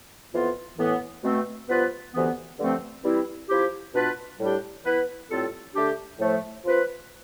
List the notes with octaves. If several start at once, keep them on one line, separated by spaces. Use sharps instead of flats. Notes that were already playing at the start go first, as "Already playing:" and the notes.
F2 E3 B3 F4
A2 E3 B3
B2 A3 C4
G2 F3 B3 F4 B4
D2 C3 E3 B3
G2 D3 F3 A3 C4
E3 G3 C4 E4
F3 C4 E4 G4
B2 B3 D4 F4 B4
A2 G3 D4 G4
E3 B3 E4 B4
A2 G3 C4 F4 A4
D3 A3 D4 G4
A2 F3 A3
F3 C4 F4 B4